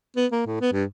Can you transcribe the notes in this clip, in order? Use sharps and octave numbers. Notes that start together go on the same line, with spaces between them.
B3
A#3
A2
B3
G2